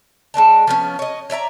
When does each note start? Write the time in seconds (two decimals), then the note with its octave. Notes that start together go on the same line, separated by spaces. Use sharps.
0.34 G#3 A#3 D4 A5
0.67 F3 B3 C#4
0.99 C#5 D#5
1.30 C#5 D5 E5 A#5